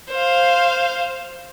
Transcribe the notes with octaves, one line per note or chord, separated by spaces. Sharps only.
C5 F5